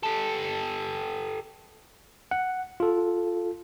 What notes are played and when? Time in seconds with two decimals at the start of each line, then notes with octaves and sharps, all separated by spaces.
0.03 G4 A4
2.31 F#5
2.80 F4 A4